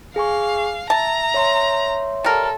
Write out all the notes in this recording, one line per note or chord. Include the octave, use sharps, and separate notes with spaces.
G#4 F5 G#5 C#6
E5 A5 A#5
C#5 E5 C6
G3 A4 A#4